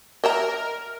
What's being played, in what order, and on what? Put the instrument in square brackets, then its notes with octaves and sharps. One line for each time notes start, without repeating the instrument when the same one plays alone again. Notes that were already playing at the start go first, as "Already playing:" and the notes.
[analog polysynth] A#4 [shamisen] D#5 E5 A#5